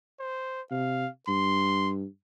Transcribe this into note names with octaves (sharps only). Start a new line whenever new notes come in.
C5
C3 F5
G2 C6